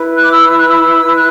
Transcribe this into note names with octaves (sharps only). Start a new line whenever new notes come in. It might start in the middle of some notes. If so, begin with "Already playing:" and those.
Already playing: E4 B4
F#6
D6
E6
E6
F#6
E6
F#6